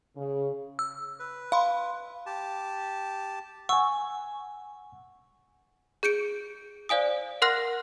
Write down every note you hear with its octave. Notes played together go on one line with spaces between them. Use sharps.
C#3
E6
B4
F5 B5 C6
G4 A5
F#5 G#5 C#6 E6
G#4 G6 C#7 D7
C5 D5 F5 G#5 D#6
A#4 F#5 C6 F6 F#6 A#6